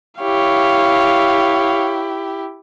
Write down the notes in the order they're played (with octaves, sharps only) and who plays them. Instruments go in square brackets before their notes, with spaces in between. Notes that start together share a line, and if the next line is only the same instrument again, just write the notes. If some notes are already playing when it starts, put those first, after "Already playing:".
[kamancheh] E4 G4 [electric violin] C#5 F5